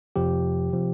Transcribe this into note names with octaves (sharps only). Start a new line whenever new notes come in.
F2 C3 F3 G4
C3 F3